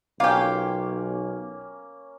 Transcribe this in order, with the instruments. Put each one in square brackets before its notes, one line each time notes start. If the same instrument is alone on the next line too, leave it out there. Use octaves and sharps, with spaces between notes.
[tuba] B1 [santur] A#3 C#4 [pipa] F4 G4 [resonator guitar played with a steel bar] F5